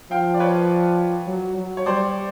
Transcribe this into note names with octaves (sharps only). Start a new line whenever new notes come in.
F3 F5 G5
D5
B4 C#5
F#3
F#3
C#5
G3 C5 D5